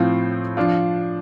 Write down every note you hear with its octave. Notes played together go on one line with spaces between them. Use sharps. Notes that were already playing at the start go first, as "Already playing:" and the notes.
Already playing: A2 F3 C4 F4
F3 D4 F4